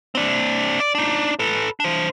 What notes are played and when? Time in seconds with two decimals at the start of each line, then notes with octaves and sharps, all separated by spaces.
0.15 C4 D4
0.80 D5
0.95 D4 D#4
1.39 A4 B4
1.80 D4 C5